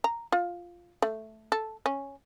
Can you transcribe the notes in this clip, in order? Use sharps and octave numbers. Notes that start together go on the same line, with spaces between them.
A#5
F4
A3
A4
C#4